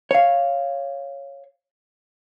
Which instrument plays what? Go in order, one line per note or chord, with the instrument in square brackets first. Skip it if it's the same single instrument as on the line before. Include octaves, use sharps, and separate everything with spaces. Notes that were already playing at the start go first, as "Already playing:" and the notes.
[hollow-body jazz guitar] C#5 F5